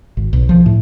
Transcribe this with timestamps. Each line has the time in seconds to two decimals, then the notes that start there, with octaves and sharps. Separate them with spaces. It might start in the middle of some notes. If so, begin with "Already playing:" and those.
0.17 G#1
0.33 B1
0.49 F3
0.66 A2